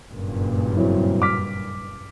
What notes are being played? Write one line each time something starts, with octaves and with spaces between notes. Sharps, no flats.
F#1 G2 A#2
F#3 C4 E4
D6 F6 B6